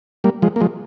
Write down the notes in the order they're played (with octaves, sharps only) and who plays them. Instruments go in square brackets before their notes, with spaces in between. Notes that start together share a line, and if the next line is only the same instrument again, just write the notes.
[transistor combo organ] G3 A#3
F3 G#3
A#3
F3 G#3